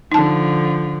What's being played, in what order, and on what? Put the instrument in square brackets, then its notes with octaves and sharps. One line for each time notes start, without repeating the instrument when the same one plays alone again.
[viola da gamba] D3 F3 [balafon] D#4 A5